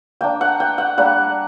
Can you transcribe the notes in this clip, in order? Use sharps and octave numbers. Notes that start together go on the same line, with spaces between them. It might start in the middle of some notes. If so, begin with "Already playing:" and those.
A#3 D4 G5
F#5
G5
F#5
G3 A#3 D4 F#5